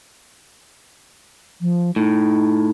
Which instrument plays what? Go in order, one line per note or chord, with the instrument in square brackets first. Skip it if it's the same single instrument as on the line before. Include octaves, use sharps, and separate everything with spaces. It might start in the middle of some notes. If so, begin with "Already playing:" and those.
[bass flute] F3
[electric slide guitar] A2 [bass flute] D#4